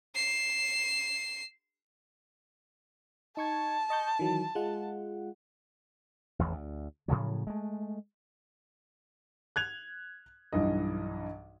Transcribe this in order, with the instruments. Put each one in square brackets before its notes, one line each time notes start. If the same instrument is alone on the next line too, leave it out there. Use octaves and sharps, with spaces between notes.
[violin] C7 E7
[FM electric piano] D#4 C#6 G#6 [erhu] A5
[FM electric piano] D#5 C#6 G6
D#3 E3 F#3
G#3 F4 F#5
[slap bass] A1 E2 D#3
D2
A2 C#3 F3 F#3
G#3 A3
[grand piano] F#6 G#6 F7
B1 G2 E3 D#5